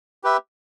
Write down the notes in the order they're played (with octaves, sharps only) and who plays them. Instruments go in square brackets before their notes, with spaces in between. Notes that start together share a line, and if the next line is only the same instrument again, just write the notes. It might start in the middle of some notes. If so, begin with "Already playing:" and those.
[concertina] G4 B4 E5